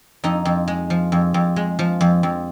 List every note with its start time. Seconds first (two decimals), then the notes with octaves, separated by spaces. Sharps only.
0.24 F2 D#4
0.45 F2
0.68 G#3
0.90 F3
1.12 F2
1.34 F2
1.56 G#3
1.79 F3
2.01 F2
2.23 F2